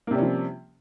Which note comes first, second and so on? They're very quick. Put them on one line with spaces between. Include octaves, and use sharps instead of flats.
A#3 C3 G3 C#4 F3